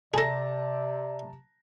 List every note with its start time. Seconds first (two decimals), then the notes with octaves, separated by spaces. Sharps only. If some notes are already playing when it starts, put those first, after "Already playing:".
0.14 C3 G#4 A4 D5 A5 A#5 A#6